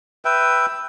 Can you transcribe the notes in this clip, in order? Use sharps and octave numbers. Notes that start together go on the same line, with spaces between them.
B4 E5 G5